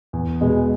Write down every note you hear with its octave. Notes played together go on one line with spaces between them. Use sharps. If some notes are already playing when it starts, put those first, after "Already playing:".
E2
B2 G#3